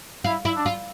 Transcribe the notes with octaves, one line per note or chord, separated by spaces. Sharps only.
E4 F4
E4
D4
F4